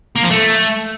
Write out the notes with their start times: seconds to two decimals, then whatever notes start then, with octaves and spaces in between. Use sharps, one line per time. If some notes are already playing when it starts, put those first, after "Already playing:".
0.16 A#3
0.23 F3
0.30 A3